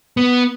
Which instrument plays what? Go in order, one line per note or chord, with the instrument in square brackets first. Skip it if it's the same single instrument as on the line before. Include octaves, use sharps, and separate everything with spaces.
[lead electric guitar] B3